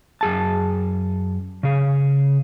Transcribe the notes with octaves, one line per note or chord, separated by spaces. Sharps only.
F#2 G#4 A5
C#3 G#4